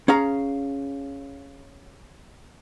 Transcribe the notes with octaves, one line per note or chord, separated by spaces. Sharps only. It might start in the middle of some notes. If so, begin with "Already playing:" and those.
C#4 G#4 F5 A#5